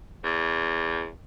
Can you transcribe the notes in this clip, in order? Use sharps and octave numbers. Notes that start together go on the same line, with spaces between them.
E2